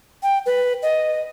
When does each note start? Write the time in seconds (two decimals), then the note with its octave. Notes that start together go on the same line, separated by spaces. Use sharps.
0.23 G5
0.46 B4
0.83 D#5